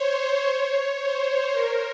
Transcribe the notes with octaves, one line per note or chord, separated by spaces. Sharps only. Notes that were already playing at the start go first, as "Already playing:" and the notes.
Already playing: C5 C#5
C#5
C5
A#4